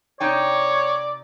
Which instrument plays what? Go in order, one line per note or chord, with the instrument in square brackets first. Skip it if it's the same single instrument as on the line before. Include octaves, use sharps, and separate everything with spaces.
[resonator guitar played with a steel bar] C3 D#4 G5 [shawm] C#5 [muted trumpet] D5